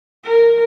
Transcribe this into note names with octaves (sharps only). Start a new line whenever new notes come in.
A#4